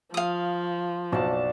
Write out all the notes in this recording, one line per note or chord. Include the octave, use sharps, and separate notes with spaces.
F3 F5 D#6
F#1 B1 F#4 D5 A5